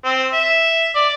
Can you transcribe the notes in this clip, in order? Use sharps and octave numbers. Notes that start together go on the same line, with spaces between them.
C4
E5
D5